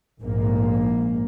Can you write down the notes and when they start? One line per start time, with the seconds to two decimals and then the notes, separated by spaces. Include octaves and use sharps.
0.20 A#1 G#2 A#3